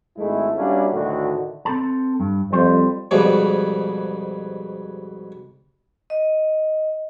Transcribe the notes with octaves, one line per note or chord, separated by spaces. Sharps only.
G#1 G#2 G#3 A3 E4
G3 A#3 C#4 D4 E4 F#4
D2 A2 D3 D#3 E4 F#4
C4 A4 A5
G2
F2 G3 C5
F2 G#2 B2 G3
D#5